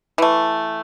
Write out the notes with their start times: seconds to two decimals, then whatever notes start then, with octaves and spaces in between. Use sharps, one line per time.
0.18 E3 A3